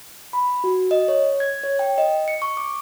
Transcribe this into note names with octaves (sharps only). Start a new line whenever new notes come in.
B5
F#4
D#5
C#5
G#6
C#5
G5
D#5
C#7
C#6
D6